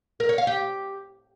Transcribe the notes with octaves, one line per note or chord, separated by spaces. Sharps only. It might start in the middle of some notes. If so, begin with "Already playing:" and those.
A#4
C#5
F5
G4